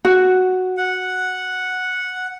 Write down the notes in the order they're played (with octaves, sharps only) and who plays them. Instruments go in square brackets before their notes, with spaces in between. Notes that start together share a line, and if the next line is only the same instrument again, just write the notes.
[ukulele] F#4
[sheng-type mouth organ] F#5